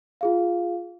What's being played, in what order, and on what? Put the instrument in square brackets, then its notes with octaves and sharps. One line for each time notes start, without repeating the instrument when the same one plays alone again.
[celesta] F4 G#4 F5